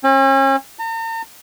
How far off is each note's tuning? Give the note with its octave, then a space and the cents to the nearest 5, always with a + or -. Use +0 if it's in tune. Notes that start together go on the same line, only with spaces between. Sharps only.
C#4 -40
A#5 -45